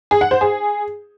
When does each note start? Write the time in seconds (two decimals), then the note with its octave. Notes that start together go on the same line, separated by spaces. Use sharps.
0.11 G#4
0.21 F#5
0.31 C5
0.41 G#4